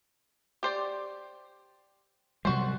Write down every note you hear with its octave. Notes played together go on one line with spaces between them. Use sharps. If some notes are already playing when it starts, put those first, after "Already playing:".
G4 C5 D5
C3 F#3 G3 F#4 C5